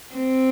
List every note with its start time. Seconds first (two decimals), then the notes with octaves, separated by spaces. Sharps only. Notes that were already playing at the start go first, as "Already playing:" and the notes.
0.15 C4